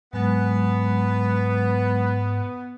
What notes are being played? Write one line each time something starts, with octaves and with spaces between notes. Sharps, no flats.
G#2 F#3 G#3 B3